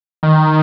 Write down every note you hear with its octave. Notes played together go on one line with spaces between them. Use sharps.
D#3